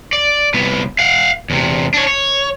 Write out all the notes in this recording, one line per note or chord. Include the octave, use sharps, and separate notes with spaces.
D5
C2 B3
F5 F#5
E2 C3
D4 C#5
C#5